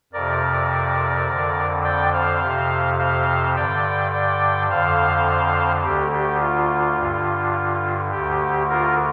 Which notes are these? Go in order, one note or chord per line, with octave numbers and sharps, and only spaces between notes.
F2 C3 A#4 D5
F2 D3
D5 G5
C5 F5
F2 C3
C5 F5
G2 D3 D5 G5
D5 G5
F2 D3 C5 F5
D2 D3 G4
G4
F4
G2 D3
D2 D3 G4
F4 A#4